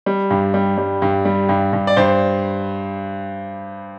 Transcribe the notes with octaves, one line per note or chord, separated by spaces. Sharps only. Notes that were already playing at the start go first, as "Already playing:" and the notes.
G3
G2
G3
G3
G2
G3
G2
G2
D5
G2 C5